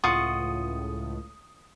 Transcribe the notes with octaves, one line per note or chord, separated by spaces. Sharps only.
C#2 A2 F4 F#5 C#6 D#6